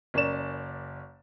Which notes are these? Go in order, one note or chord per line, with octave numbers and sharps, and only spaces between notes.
F#1 C#4 A#4 D5 E7